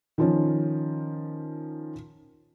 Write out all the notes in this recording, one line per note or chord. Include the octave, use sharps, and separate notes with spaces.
D#3 F3 C#4